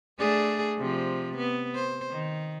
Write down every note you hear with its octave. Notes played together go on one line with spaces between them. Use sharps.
A3 D4 G#4
C3 F3
B3
C5
D#3